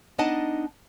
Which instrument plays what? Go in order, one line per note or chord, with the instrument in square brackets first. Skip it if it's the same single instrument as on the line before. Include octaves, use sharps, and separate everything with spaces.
[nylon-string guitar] B3 D4 D#4 D#5 F#5 A5